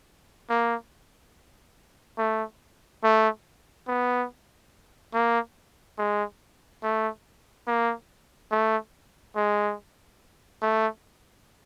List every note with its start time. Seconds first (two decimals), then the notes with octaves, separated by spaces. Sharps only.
0.50 A#3
2.18 A3
3.04 A3
3.88 B3
5.14 A#3
5.98 G#3
6.83 A3
7.68 A#3
8.51 A3
9.36 G#3
10.62 A3